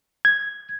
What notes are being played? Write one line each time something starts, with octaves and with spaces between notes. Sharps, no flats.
G#6